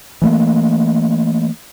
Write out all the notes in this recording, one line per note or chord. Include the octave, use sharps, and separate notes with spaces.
E3 A3 A#3